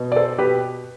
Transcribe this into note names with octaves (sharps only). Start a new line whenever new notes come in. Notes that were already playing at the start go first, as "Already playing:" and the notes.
Already playing: B2
D5
A4 C5
B2 G4 B4